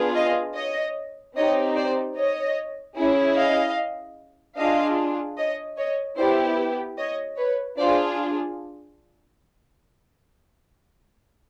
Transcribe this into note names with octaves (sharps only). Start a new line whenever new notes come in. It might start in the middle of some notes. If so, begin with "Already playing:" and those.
Already playing: B3 D4 F4 G#4
D#5 F5
C#5 D#5
C4 D#4 G4 C#5 D#5
C5 D5
C#5 D#5
C#4 E4 G#4
D#5 F5
D4 F4 G#4 D#5 F5
C#5 D#5
C#5 D#5
B3 E4 G4 C5 D5
C#5 D#5
B4 C#5
D4 F4 G#4 C5 D5